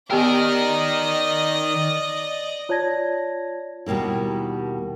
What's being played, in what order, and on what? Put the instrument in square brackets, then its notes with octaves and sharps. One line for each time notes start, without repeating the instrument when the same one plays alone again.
[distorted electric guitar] D#3 A#4 [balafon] B3 G4 G5 [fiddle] D5 D#5
[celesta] F4 C#5 D5 A5 G#6 A#6
[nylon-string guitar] D#2 B2 G3 A#3 E4